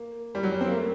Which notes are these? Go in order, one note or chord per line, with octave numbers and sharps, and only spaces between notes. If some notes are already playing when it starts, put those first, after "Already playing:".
Already playing: A#3
G3
F#3
G3
C4
A#3
A3